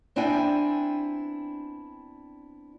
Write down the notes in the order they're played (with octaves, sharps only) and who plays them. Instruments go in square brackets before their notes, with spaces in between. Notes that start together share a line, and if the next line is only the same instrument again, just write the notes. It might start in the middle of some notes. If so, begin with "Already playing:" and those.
[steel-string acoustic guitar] B3 C4 D4 E4 G5 G#5